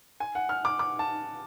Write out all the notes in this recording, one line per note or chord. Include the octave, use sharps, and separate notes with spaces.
G#5
F#5
F6
D6
D6
A5